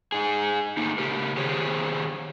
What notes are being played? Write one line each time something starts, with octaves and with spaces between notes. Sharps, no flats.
D#4 G#4
A3 A#3 D#4
C#3 G4 A#4
D#3 G4 G#4 C5 C#5